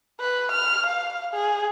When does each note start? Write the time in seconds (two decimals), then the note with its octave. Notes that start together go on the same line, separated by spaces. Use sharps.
0.20 B4
0.52 F6
0.87 F5
1.33 G#4